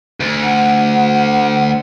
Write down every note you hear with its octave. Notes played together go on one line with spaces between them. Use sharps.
D2
F#5